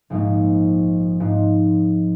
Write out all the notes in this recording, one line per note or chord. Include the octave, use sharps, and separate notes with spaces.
A#1 G#2 F3 G#3 D#4
G#2 F3 C4 D#4